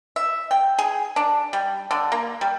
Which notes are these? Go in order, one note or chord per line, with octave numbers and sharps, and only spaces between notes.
E5
G5
G#4
D4
G3
D3
A#3
G3